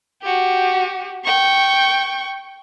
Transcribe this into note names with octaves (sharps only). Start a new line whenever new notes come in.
F#4 G4
G5 C#6